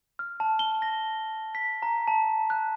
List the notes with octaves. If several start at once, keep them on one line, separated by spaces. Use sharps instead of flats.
F6
A5
G7
A#6
B6
A#5
A5
F#6